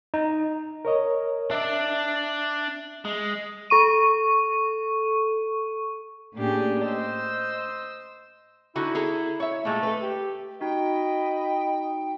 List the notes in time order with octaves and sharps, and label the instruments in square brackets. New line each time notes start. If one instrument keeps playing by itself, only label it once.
[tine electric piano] D#4
[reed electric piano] A#4 C#5 D#5
[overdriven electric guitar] D4 D5 [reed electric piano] E5
[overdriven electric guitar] G#3
[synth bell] A4 C#6 D#7
[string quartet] A2 A#3 C#4 D4 G4 G#4
C5 D#5 E6
[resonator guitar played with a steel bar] D3 D#4 F#4 [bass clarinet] E4
[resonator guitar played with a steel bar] G#4 A4 A#5
C#5 E5
[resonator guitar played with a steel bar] A#2 G#3 [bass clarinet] A3
[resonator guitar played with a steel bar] A4 B4
[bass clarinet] G4
[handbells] D#4 F#4 [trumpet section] D#5 B5 [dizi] G5